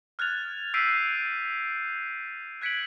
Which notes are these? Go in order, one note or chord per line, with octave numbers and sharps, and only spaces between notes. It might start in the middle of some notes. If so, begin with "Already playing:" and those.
F6 F#6 G#6 A6 F7
E6 G6 B6 C7 D7 D#7
F#6 G#6 B6 C#7 D7 F#7